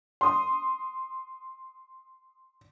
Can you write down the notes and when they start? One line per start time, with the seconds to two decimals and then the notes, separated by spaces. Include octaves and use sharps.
0.21 C6 D#6